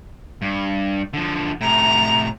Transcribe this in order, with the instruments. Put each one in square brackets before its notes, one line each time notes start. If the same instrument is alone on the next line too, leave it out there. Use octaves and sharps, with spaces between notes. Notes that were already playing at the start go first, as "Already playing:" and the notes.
[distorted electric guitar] G2
D3 F3
[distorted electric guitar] A2 C3 [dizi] A#5